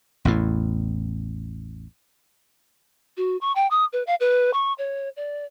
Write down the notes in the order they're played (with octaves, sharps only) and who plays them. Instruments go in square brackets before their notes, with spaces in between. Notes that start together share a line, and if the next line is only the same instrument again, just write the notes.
[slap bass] A1 E2 A2
[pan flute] F#4
C#6
G5
D#6
B4
F5
B4
C#6
C#5
D5